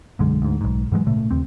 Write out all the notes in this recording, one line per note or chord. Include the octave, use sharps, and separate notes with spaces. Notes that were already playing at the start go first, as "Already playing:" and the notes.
B1 F#2 D3 G#3
D2 G#2
B1 G#2
G#2 E3 F#3 G#3
A#2 C#3 A3
D#2 C4